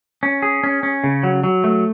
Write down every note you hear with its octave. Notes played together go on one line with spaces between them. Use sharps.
C#4
G#4
C#4
C#4
C#3
F#3
F#3
A3